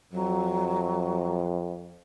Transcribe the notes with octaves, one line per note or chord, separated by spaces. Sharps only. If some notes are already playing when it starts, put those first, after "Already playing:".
F2 F#3